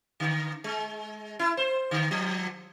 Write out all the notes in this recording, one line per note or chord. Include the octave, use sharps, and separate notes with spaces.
D3
G#3
E4
C5
D3
F3